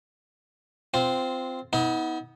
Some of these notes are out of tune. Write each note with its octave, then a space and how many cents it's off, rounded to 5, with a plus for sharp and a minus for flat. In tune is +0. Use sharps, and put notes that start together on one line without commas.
C4 -10 F4 +0
B3 +0 D#4 +45